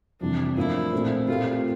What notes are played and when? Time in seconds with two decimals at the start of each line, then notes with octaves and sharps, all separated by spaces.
0.21 F2 C3 E3 G3 D4
0.57 A2 F3 A#3 D4 E4 F4
0.93 A#2 A3 C4
1.28 A#2 A3 C4 F4 G4